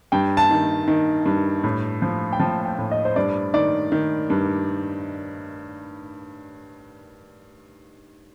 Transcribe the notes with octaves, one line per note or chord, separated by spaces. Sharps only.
G2 G5
A5
D#3
D#3
G2
A2
F3
G5
F3 A5
G5
A2
D#5
C5
G2 D5
D#3 D5
D#3
G2